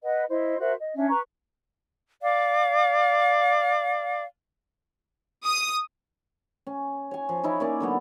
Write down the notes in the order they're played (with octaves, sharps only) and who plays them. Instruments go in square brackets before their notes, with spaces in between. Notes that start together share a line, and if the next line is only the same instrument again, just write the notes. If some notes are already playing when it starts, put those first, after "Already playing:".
[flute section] B4 D#5 F#5
E4 C5 D#5
F#4 A#4 C5 E5
D#5
C#4 D4 E5
B4 A#5 C#6
D5 F5
[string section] D#6
[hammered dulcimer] C#4
C#5 G#5
F3
D#4 E4 C#5
A#3 C#4 D5
D3 F#3 B3